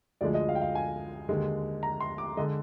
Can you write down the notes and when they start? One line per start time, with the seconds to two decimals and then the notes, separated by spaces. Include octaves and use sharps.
0.21 D2 D3 F3 G#3 D5
0.34 D#5
0.49 F5
0.55 G5
0.61 F5
0.75 G#5
1.28 D#2 D3 G#3
1.83 A#5
2.00 C6
2.18 D6
2.37 D3 G#3 D#5